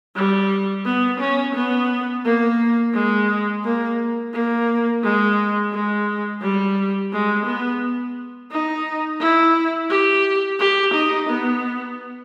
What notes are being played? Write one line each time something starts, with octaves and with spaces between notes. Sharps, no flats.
G3
B3
C#4
B3
A#3
G#3
A#3
A#3
G#3
G#3
G3
G#3
B3
D#4
E4
G4
G4
D#4
B3